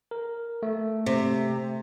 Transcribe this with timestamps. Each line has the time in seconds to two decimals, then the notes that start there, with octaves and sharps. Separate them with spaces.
0.11 A#4
0.63 A3
1.06 C3